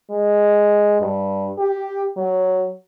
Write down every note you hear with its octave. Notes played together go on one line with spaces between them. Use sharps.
G#3
G2
G4
F#3